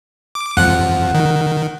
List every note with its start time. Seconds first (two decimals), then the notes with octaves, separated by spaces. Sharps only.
0.35 D6
0.57 F2 F3 F#5
1.14 D#3